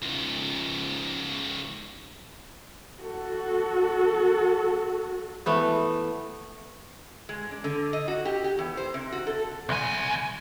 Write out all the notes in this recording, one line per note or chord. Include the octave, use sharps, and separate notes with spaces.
C#2 G#2
F#4 A4
E3 A3 B3
G#3
D4
D3
D#5
F#4
G4
G4
E2
C5
C3
F#4
A4
C2 G#5